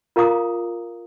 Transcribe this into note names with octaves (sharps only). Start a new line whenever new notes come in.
F4 A#4 F5 A#5 D6 D#6